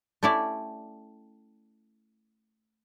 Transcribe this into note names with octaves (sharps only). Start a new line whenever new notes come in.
A3 C#4 E4 G4 D5